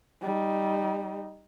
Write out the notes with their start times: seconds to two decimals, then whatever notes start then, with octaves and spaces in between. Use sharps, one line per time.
0.22 G3 D#4